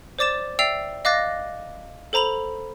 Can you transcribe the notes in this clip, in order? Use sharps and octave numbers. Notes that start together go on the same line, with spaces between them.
C5 D5 D6 A6 E7
D5 E5 G5 E6 C7 F7
D#5 F5 D6 F#6 A6 A#6
A4 C5 A#5 B5 F7